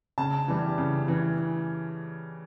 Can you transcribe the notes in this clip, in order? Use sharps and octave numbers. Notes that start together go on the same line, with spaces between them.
C#3 A5
E3 G3
C#3
E3